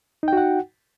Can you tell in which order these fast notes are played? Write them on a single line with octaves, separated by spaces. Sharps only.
D#4 G5 F#4 F#5